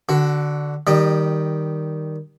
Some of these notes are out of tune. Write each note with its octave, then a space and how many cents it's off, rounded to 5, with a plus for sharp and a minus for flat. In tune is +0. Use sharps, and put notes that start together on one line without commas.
D3 +0 F#4 +15
D#3 +0 G3 +0 D#5 -40